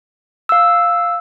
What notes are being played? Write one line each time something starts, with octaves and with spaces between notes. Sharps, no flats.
F5 E6